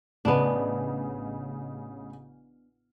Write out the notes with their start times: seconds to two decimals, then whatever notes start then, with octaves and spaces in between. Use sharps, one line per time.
0.25 A1 C#3 B3 D4 D#5